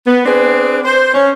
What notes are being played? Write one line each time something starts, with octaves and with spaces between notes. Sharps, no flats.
B3
C4 D4 G#4 B4
C5
C#4